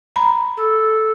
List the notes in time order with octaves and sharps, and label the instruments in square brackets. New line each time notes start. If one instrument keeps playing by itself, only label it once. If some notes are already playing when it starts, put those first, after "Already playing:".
[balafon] A#5 B5
[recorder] A4